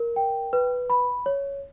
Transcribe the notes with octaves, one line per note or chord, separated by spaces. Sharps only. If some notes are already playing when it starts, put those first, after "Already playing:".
Already playing: A#4
G5
B4
B5
C#5